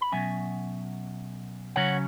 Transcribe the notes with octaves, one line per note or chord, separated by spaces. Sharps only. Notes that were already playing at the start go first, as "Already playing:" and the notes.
B5
B2 F#3 C#4 E5 G#5
C#3 F#3 C#4 C#5 F#5